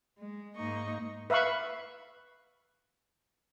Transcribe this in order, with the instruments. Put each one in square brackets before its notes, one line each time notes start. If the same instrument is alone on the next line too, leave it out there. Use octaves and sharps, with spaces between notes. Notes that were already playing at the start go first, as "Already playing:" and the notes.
[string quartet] G#3
G#2 A#3 D#4 D#5 C#6
[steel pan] B4 E5 F5 B5 C#6